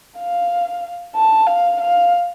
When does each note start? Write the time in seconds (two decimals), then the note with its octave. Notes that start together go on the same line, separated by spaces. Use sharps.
0.19 F5
1.15 A5
1.47 F5
1.80 F5